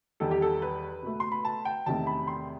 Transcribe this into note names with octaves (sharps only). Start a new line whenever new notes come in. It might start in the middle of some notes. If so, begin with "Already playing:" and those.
E2 D#3 G3 A4
G4
A4
B4
B2 A3
C6
B5
A5
G5
E2 C3 D#3 A3 A5
B5
C6